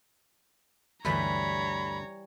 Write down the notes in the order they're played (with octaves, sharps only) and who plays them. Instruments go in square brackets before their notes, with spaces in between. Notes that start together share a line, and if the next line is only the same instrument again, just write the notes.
[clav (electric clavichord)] D2 G2 [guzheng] E3 G3 B4 [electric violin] C#5 A#5 [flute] B5